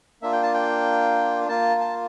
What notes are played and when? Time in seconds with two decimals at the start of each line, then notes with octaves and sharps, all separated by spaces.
0.22 A#3 D4 F4 E5
0.32 G5
0.43 A5
0.54 G5
1.48 A#3 F4 A5
1.80 A5